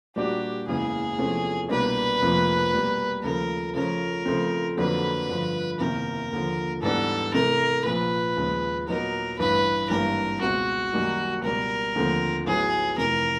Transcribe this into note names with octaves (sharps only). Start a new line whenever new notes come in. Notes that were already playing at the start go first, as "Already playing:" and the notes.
A#2 G3 A#3 D4 F#4 G4
F#1 E2 C#3 E3 G#3 G#4
E2 C3 F3 A3 C#4
C2 B2 G3 A#3 D4 B4
F1 F2 C3 F3 A#3
B2 G3 A#3
D#2 C#3 F3 A3 A#4
C#3 F3 A3 C#4 A#4
C#3 F3 A3 C4
F2 D3 F#3 A#3 D4 B4
G2 D3 F3
F#1 E2 C3 D#3 A#4
D#2 D3 F3
G#2 E3 G3 B3 D4 A4
C3 E3 A3 A#4
A#1 A#2 F3 B4
D#2 C#3 F3 G#3
A#2 F#3 B3 D#4 A#4
A1 G2 E3 B4
G#1 G2 E3 G3 A#3 A#4
C#2 B2 G#3 C4 F#4
F#2 D#3 G3 A#3 D#4
C#2 B2 G3 A#4
D#2 D3 F3 A3 C4
A1 A2 F#3 B3 G#4
F1 F2 C3 E3 A#4